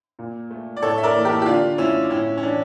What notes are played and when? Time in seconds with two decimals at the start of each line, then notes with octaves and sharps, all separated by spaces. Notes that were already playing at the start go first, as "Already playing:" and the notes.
0.19 A#2
0.51 A3
0.76 D5
0.82 A2 A4 C#5
0.98 E5
1.03 A#4 D5
1.14 E3 A#3
1.25 G4 A#4
1.42 G4
1.46 D3 D4 F4
1.78 A3 C#4 E4
2.10 A2 C#4 E4
2.37 C#4
2.42 E3 A3 D4